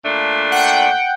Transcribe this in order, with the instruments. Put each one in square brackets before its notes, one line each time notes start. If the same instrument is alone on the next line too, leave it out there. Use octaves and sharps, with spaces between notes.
[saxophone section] A#2 A3 D4
[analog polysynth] F#5 G5